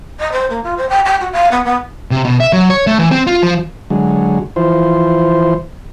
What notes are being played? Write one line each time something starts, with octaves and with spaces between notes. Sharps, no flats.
D#5
C5
A#3
F4
C5
G5
G5
F#4
F5
B3
B3
C3
B2
E5
F#3
C#5
A3
E3
C4
F4
F3
D3 F#3 G#3
E3 F3 C5